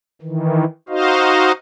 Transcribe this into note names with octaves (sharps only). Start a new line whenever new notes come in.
D#3 E3
D#4 F#4 C5 D#5 F5